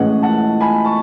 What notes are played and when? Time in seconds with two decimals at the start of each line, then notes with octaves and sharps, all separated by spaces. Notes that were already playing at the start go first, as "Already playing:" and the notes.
Already playing: A2 E3 G#3 C#4 D#5 F#5
0.22 F#5 A5
0.60 G#5 B5
0.85 A5 C#6